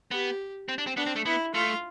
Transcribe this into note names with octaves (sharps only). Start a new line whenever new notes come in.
B3 G4
C4
D4
C4
B3 D4
C4
A3
B3 E4
A3 F4